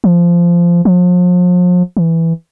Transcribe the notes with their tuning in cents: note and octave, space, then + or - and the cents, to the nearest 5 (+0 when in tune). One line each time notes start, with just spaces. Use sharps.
F3 -15
F3 +40
E3 +0